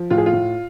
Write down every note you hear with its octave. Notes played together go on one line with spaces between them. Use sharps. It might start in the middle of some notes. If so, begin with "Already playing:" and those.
Already playing: F3
A2 F4
G#4
F4
A2